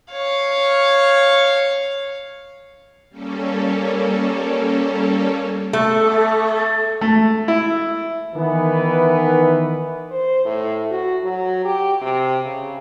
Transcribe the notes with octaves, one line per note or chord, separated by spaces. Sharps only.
C#5 F5
G3 A#3 C#4 A4
A3
A3
E4
D#3 E3 B3
C5
A2
F#4
F#3
G4
C3
C#3